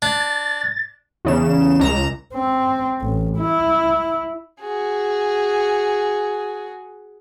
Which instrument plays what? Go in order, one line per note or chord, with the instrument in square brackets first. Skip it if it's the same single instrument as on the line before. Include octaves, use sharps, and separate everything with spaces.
[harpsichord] D4 [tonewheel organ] A6
[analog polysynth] E2 C#3 E7
C#2 A#5 E7
[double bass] C4
A1
E4
[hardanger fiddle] F#4 G#4